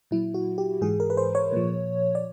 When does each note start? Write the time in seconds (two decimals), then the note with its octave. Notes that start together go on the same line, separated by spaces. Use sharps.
0.11 A#2 F#3 E4
0.34 F#4
0.58 G4
0.81 G#2 E3 G#4
1.00 A#4
1.10 B4
1.17 C5
1.35 C#5
1.52 A#2 F3
2.15 D5